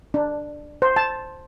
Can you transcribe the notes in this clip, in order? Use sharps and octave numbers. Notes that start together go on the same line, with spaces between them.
D4
C5
A5